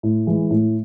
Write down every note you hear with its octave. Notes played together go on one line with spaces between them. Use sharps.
A2
E3 G#3
A2